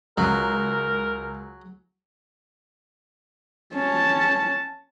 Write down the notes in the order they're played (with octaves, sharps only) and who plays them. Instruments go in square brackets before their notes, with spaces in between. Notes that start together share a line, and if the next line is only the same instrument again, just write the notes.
[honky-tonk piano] C#2 A#5 [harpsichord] F#3 [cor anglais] A#4
[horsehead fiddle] C#4 A5